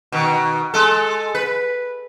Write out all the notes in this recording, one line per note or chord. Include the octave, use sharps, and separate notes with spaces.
B2 D#3
G#3 A4
B4